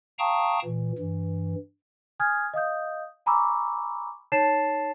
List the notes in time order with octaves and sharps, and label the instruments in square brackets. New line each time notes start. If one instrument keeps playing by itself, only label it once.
[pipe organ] F5 G5 A5 A#5 C#6 D#6
A#2 E3
G2 E3
[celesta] G#5 D#6 F6 G6 G#6
D#5 F5 D#6 G6
G#5 A#5 B5 C#6 D6 E6
D#4 C#5 A5 A6 C7 E7